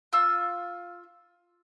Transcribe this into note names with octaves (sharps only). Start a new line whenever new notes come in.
F4 E6